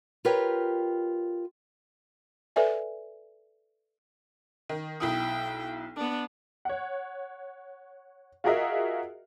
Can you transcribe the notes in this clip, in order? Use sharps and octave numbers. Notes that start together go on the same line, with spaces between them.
F4 G4 A#4 B4 C#5 G5
A4 B4 D5 E5 G#5
D#3
B1 E4 G5 D#6
B3 D4
C#5 F#5
F4 F#4 G#4 A#4 D#5 E5